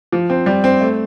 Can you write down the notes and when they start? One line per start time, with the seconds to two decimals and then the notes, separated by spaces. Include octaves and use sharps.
0.12 F3
0.30 C4
0.46 G3
0.64 C4
0.81 A3